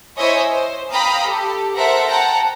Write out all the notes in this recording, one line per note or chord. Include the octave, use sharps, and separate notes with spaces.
E4 C5 C#5 D#5 E5 G#5
C5
F5 G5 A#5 B5 D#6
G4 A4
A4 A#4 C5 E5 F#5 A#5
F#5 G5 A5 A#5